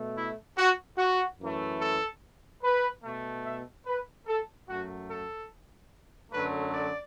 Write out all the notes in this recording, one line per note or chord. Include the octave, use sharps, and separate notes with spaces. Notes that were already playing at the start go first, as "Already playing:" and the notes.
Already playing: B2 A3
E4
F#4
F#4
F#2 E3 A3
A4
B4
B2 A3
E5
B4
A4
F#2 F#3 A3 F#4
A4
F#2 D3 F#3 A3 B4
D5